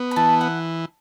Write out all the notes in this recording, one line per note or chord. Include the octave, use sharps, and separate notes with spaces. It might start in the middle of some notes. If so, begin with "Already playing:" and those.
Already playing: B3
B5
E3 A5
F#5